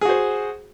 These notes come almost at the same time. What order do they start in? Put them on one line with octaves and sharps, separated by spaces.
G#4 F#4 C5